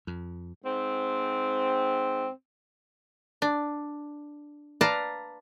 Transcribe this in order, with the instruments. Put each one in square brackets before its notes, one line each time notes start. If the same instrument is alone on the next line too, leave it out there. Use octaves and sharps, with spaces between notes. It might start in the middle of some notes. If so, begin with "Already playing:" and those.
[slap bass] F2
[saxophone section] G#2 C4
[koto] D4
B4 D5 F5 A5 A#5